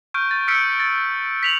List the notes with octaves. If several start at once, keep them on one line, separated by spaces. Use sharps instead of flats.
C#6 F6 G6 D7
A6
E6 F6 B6 C#7 D7
A6
B6 F7 F#7